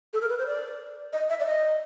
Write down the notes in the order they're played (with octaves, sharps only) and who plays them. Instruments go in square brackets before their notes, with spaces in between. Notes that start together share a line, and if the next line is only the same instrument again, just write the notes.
[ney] A4
A#4
B4
C5
D5
D#5
E5
D5
D#5